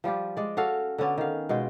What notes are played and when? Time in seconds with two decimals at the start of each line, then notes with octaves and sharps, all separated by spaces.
0.04 F3 G3 F4 G4
0.37 G#3 D5
0.57 C#4 F#4 A4 F5
0.98 D3 B3 C#4 D5
1.18 D#3 F5
1.49 B2 G#3 F4 G5